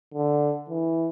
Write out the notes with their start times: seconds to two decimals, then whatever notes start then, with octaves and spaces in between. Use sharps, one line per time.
0.14 D3
0.70 E3